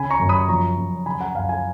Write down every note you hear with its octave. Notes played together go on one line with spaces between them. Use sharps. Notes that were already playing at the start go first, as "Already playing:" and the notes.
Already playing: C#3 G#5 B5
A#5 C#6
F#2
B5 D#6
F3 A#5 C#6
F#2
C#3 G#5 B5
F#5 A#5
F#2 F5 G#5
F5 G#5